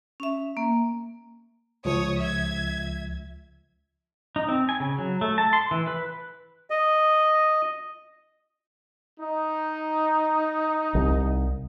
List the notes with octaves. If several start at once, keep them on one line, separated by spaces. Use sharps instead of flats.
C#4 E5
A#3
C#2 F3 C#5 D#6
E5 G#6
D#4
C4
G#5
C#3
F#3
A3
A5
C6
E3
B4
D#5
D#4
C2